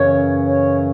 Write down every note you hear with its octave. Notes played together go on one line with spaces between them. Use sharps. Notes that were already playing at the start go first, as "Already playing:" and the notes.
Already playing: F#2 C#3 E3 C#5
C#5